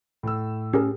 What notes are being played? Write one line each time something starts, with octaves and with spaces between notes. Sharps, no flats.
A2 E6
C#4 G4 G#4 A#4